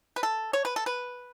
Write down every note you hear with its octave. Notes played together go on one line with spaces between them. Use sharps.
B4
A4
C#5
B4
A4
B4